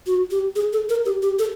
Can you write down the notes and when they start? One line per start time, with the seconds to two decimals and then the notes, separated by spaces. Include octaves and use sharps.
0.07 F#4
0.31 G4
0.56 G#4
0.73 A4
0.90 A#4
1.06 G4
1.22 G4
1.39 A4